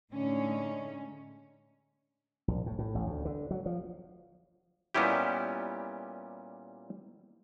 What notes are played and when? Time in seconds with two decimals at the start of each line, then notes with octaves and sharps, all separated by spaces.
0.13 A2 D3 G#3 A3 C#4 D#4
2.48 A#1
2.66 A2
2.79 A2
2.95 A1
3.06 D2
3.25 D3
3.51 F#3
3.66 F3
4.95 A#2 G3 B3 C#4 E4 G4